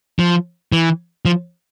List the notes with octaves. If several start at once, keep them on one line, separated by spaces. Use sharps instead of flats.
F3
E3
F3